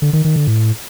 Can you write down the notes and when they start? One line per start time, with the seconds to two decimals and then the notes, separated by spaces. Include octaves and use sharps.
0.02 D3
0.13 D#3
0.25 D#3
0.36 D3
0.47 A2